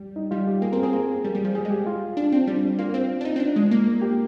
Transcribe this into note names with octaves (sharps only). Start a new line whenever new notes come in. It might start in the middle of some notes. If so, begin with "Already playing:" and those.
Already playing: G3
D#4
G3 F4
G4
A#3 G#4
C4 A#4
C4 G#4
A#3
G3
G3
F3
G3 G#4
G#3
G4
F4
D4
C4
G3 D4
A#3 F4
C4
D4
D#4
C4
D4
G#3
A#3
G4